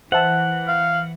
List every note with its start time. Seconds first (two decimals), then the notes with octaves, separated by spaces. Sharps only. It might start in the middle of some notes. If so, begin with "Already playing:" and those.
0.12 E3 C5 E5 F#5 A5
0.68 F5